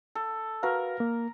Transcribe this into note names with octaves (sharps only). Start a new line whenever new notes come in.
A4
F#4 A#4 B4 F5
A#3